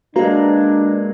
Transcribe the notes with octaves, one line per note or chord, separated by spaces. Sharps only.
G#3 A#3 D4 F#4 B4 A#5